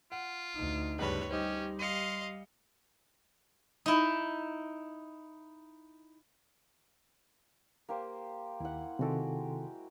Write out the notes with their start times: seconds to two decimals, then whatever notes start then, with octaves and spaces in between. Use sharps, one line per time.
0.12 F4 F#5
0.56 D2 D#4
0.99 C#2 G2 B4 C#5
1.31 G3 C#4 D#4 G4 C5
1.79 D#5 F5 C6 C#7 D#7
3.86 D#4 E4
7.89 A#3 G4 C5
8.60 D#2 E4 F#5
8.99 C3 D#3 G#3 F#4 G4 A4